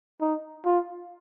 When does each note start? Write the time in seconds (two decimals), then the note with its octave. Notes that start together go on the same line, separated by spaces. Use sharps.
0.21 D#4
0.65 F4